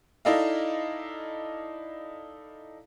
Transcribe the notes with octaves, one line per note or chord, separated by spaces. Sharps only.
D#4 E4 A4 D5 D#5 F5